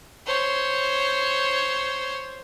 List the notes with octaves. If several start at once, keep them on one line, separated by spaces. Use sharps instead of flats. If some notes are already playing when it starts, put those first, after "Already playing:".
C5 C#5